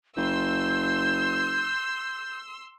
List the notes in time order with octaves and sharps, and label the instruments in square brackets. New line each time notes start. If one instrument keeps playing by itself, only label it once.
[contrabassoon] F#1 [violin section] C6 E6 [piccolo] G6